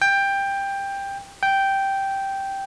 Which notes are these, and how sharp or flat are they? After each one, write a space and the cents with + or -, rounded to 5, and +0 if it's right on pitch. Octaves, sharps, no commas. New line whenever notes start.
G5 +15
G5 -5